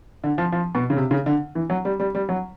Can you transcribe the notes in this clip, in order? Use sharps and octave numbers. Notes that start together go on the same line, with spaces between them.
D3
F3
F3
B2
C#3
C3
C#3
D3
E3
F#3
G3
G3
G3
F#3